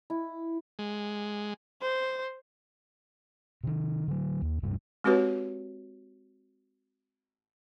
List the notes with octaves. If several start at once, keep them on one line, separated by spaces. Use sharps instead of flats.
E4
G#3
C5
C3 D#3
D3 F#3
D#2
D1 G2 C3 G3
G#3 C4 F#4 G4 B4 C#5